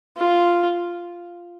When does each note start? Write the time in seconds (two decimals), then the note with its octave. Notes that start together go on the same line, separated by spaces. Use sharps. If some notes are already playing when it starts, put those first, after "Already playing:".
0.17 F4